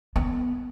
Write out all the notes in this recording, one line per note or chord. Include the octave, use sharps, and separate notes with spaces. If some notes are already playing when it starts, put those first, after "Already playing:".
B3